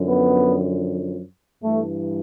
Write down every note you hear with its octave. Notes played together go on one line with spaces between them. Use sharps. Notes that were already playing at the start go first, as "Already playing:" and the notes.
Already playing: F#2 D3 F3
B3
G2 E3 A3